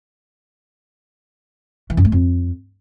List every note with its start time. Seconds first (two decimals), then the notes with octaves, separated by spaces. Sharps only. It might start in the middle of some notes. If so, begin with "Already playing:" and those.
1.90 E3
1.97 F#2
2.05 A3
2.12 F2